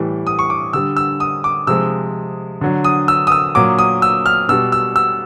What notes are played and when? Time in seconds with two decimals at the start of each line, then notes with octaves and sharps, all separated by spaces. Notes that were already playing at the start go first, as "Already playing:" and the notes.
Already playing: A2 E3 G3
0.27 D#6
0.39 C#6
0.50 D6
0.73 D3 G3 E6
0.97 E6
1.20 D#6
1.44 D6
1.67 C3 F3 G#3 E6
2.61 D3 F#3
2.84 D#6
3.08 E6
3.27 D#6
3.32 E6
3.55 A#2 F#3 D6
3.79 D#6
4.02 E6
4.26 F6
4.49 B2 G3 E6
4.72 E6
4.96 E6